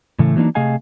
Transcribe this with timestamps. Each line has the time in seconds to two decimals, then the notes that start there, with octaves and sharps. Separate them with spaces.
0.19 A2 C#3 E3 A3
0.36 E3 F#3 A#3 D4 D#4
0.55 C3 A3 G#4 D#5 F5 G#5